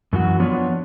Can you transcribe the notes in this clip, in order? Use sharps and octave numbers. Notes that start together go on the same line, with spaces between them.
F#2 E3 F#3 F#4
F3 B3 D4 F4 C#5